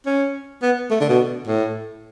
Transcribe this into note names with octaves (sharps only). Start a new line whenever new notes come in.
C#4
B3
A3
D3
B2
A2